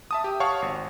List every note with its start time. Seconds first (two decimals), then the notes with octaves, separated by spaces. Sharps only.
0.11 E5 A5 D#6
0.24 G4
0.40 C#5 F5 F#5 A5 C#6
0.62 G#1